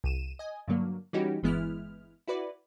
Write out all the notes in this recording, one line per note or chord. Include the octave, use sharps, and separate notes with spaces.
C2 D#7 E7
D#5 G#5
G2 D3 F#3 A#3
E3 G3 C#4 D#4 F#4 G4
G1 E3 G#3 B3 E4 F6
E4 F#4 B4 D5